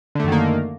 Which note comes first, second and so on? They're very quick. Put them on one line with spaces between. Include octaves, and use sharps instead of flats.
D3 A3 F#2 D#3 A#3